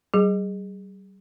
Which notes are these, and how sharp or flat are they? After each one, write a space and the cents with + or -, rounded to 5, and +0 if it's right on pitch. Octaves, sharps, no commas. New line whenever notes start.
G3 -35 G#4 -10